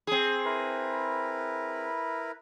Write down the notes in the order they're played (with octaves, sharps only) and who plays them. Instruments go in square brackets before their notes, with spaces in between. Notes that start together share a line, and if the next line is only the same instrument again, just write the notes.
[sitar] C4 G#4
[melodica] E4 A#4 B4